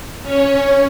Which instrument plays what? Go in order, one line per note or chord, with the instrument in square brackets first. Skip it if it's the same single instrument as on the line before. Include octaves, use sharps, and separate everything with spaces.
[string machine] C#4 C#5